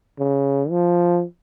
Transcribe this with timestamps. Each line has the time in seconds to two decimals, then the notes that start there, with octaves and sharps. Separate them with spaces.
0.19 C#3
0.70 F3